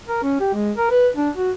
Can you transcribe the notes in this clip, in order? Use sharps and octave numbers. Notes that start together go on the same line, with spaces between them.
A#4
C#4
G4
G#3
A#4
B4
D4
F#4